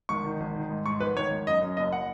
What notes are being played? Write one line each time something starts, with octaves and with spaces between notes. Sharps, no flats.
G#1 C#6
D#3
G#1
D#3
G#2
G#2 C#6
G#1 B4
D#3 C#5
G#1
F#2 D#5
F#2
F#1 D#5
F#5